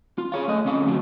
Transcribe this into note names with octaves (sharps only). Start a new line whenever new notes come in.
F4
G#4 C#5 F5
A3 D#5
F2 D3 C#4 F5
D2 F3 F#3